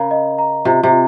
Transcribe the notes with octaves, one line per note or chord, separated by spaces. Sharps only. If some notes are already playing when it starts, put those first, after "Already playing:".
Already playing: C#3 A#4 A#5
D#5
A#5
C3 F4
C3
F4